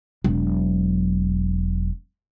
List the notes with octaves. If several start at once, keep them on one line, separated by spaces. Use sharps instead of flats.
E1 F#3